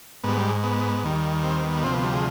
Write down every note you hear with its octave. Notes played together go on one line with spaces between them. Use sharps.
G#2 G3 B3
G3
B3
D#2 D#3 G3
C4
B3
D2 C3 F3 C4
B3
G3
G#3